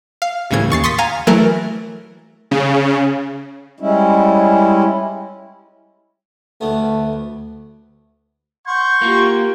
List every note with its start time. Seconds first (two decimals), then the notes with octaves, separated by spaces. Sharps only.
0.22 F5
0.51 C2 A2 C#3 E3 G#6
0.70 D#2 C#6 A6 C7
0.84 C6 C#6 D#6 A6 B6
0.98 F5 G#5 A#5
1.27 E3 F#3 A3 A#4
2.51 C#3
3.80 G3 G#3 C#4 E4
6.61 D2 A3 B3
8.67 F#5 C6 C#6 G6
9.02 A#3 F4 G4